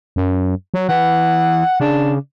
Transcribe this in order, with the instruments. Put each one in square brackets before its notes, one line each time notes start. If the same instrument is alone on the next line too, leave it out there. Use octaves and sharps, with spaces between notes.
[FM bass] F#2
F#3
[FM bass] E3 [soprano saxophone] F#5
[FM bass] C#3 [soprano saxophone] D4